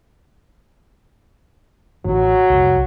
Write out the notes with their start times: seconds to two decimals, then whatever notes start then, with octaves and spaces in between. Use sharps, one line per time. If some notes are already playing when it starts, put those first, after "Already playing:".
2.05 A1 E3 F#3
2.50 C2 F2